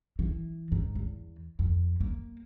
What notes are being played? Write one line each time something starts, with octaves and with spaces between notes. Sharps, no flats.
E3
G#2
E2
F2
A#3